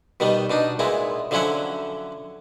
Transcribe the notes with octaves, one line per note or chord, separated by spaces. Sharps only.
B2 D#3 G3 B3
B2 D4 D#4
A#2 G#3 B3 E4
D3 F3 F#3 C#4 E4 F#5